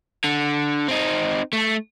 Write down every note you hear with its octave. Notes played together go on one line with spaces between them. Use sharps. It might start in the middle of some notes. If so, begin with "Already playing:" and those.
D3
C4 D#4
A3